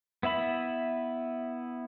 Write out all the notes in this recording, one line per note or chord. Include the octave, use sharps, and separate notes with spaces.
B3 E4 E5 B5